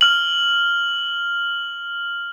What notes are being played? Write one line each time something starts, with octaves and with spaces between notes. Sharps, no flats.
F6 F#7